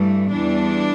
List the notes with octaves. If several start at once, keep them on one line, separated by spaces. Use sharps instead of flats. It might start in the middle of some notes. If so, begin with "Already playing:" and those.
Already playing: G2 E3 A3
E2 E3 G3 D4